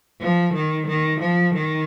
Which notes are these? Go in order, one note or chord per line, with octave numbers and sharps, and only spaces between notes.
F3
D#3
D#3
F3
D#3